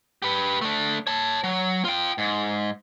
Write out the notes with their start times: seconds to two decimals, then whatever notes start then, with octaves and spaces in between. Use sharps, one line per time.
0.22 G4 B4
0.61 A3 D4
1.07 C#5 A5
1.44 F#3
1.84 F4 G5
2.18 G#2